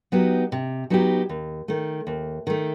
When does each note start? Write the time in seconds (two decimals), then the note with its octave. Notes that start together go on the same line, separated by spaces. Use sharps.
0.12 F#3 B3 D#4 G4
0.52 C3
0.90 F#3 B3 D#4 G4
1.29 D#2
1.68 D#3 A3
2.07 D#2
2.47 D#3 A3